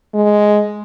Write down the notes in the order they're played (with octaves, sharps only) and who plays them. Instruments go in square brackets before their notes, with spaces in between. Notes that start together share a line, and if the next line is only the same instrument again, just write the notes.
[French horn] G#3